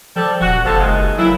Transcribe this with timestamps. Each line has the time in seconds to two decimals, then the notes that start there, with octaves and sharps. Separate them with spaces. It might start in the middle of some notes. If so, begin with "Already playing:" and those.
0.16 F3 G3 A4
0.41 D#1 F#4
0.65 F#1 C3 F3 A4
0.80 B2 D#3 G#3
1.18 E3 F#3 A#3 E4